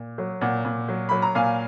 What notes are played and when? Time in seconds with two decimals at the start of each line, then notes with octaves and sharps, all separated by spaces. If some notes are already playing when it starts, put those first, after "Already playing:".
Already playing: A#2
0.18 F#3
0.41 A#2 F#5
0.65 A#2
0.88 F#3
1.09 F#3 B5
1.22 A#5
1.35 A#2 F5 G#5